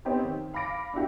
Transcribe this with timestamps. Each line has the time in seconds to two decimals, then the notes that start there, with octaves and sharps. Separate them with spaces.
0.05 B3 C4 D#4 G4 C5 C#5
0.24 D#3
0.54 F5 B5 D6 A#6 D7
0.94 D4 E4 F#4 G4